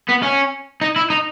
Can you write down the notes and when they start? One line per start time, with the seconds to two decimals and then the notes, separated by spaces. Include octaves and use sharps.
0.09 B3
0.23 C#4
0.81 D#4
0.96 E4
1.10 D#4